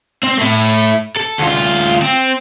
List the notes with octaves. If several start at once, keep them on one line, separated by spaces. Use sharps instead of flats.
C4
A3 E4
A4
D2 F4
C4